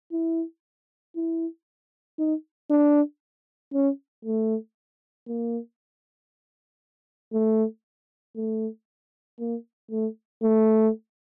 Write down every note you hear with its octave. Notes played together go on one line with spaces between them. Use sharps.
E4
E4
D#4
D4
C#4
A3
A#3
A3
A3
A#3
A3
A3